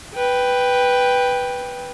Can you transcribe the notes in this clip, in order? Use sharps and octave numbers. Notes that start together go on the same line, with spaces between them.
B4 G5